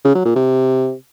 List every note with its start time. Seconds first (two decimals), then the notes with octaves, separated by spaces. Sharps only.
0.05 C#3
0.15 F#3
0.25 A#2
0.36 C3